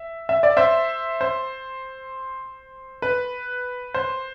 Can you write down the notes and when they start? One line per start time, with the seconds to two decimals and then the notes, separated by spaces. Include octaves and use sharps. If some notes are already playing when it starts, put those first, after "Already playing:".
Already playing: E5
0.29 E5
0.43 D5
0.57 C5 E5
1.21 C5
3.02 B4
3.94 C5